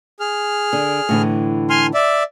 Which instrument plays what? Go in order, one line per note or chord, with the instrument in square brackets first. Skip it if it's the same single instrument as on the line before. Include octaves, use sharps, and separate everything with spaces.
[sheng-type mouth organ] G#4 F6
[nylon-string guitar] D3
A2 D3 E3
[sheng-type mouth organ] G#5 C6 F6
D5 E5